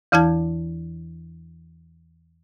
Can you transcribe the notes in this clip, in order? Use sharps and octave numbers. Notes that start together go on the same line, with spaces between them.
E2 E3 E4 A5 G#6